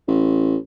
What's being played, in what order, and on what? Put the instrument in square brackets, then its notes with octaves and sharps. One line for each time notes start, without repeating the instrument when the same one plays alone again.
[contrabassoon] A1